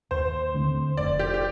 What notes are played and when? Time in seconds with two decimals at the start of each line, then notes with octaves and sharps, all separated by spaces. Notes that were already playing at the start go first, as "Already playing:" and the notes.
0.11 D#2 C5
0.54 D3 A3 C4
0.97 F1 D5
1.19 G4
1.34 G4